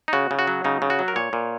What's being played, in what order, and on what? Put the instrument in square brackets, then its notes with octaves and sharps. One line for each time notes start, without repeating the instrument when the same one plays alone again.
[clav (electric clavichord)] D#4
C#3 F#4
C#3
F#4
F#3
C#3 D#4
C#3
F#4
F#3
A#4
A#2 C#5
A#2